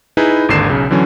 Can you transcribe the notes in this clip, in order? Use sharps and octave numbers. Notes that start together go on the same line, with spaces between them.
D#4 E4 G#4 B4
G#1 D#2 D3 D#4 C7 E7
B1 C#3
D3 E3 F#3 C#4